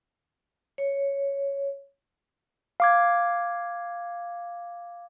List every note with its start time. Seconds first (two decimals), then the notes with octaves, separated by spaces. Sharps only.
0.78 C#5
2.80 F5 D6 G#6